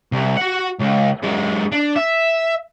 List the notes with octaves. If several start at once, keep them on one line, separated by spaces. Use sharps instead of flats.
C2
F#4 F#5
C#2
F#2 G#3
D4
E5